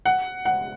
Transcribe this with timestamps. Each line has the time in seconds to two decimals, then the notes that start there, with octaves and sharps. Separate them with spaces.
0.05 F#5
0.45 F#5